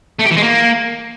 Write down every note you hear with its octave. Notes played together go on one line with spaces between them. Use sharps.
A3
G4
E3
G#3
A#3